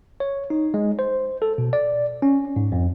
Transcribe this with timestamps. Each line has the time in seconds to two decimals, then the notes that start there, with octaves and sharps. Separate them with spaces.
0.20 C#5
0.50 D#4
0.74 G#3
0.99 C5
1.42 A4
1.58 B2
1.73 D5
2.22 C#4
2.56 G#2
2.72 F2